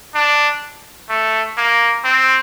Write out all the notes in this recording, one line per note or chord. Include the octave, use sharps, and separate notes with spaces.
D4
A3
A#3
C4